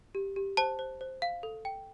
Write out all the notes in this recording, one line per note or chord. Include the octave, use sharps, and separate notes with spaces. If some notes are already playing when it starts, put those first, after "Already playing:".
G4
G4
C5 A5
C5
C5
F5
A4
G5